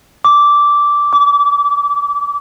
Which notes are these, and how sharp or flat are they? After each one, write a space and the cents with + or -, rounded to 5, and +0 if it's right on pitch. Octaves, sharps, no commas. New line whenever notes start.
D6 -10
D6 -35